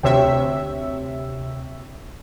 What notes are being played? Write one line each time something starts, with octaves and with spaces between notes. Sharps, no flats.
D2 C3 C#5 E5 G5